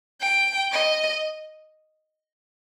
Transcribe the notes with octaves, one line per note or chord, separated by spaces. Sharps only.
G5
D#5